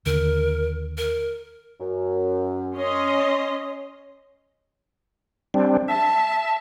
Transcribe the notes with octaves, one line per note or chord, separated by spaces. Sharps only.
D#2 D3 A#4
A#4
F#2
C#4 C#5 D#5 C6
G3 C4 D4
E5 A5